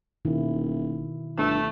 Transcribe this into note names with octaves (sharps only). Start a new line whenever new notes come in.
D#1 B2 D#3 E4
G1 A3